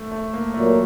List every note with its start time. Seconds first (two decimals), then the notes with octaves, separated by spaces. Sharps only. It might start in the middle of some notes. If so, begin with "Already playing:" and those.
Already playing: A3
0.12 A3
0.33 A#3
0.54 A#2 F#3 A3 A#3